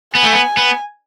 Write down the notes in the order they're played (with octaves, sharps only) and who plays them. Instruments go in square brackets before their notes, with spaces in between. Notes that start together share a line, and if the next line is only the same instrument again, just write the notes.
[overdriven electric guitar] B3 [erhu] G#5
[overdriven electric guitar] A3
B3
B3